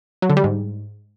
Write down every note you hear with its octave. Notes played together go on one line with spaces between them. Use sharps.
F#3
D3
G3
G#2